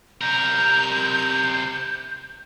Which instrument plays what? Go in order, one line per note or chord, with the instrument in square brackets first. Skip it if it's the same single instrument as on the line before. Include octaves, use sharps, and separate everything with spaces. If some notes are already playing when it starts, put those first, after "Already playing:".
[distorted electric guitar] C3 A#4 [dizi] G6